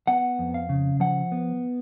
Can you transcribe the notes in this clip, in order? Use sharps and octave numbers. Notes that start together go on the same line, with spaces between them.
B3 F#5
F2
F5
C#3
F3 F#5
B3